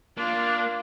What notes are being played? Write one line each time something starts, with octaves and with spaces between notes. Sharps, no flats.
A#3 D4 F4